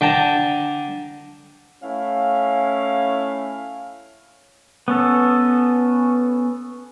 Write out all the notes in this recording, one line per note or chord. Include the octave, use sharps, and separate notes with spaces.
D3 G5 A5 A#5
A3 C#4 E4 F5
B3 C#4 A4